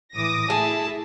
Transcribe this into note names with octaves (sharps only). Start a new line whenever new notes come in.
A2 E3 D6 D#6 A#6
A3 E4 G#4 A5